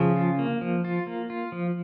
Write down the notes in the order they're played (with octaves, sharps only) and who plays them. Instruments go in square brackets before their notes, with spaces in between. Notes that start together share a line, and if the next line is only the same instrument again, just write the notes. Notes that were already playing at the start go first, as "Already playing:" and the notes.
Already playing: [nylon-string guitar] C#3 [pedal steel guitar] F3
[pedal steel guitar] F4
A#3
F3
F4
A#3
F4
F3